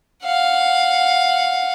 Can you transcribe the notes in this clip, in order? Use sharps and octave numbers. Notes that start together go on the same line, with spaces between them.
F5 F#5